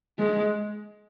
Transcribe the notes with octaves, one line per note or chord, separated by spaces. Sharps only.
G#3